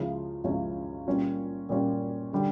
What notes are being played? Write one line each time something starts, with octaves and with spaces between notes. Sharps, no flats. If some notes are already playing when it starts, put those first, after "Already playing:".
Already playing: C#2 C#3 F3 C#4 E4
C#2 C#3 F3 C#4 E4
A#2 G3 C#4 F4
A#2 G3 C#4 F4
D3 G3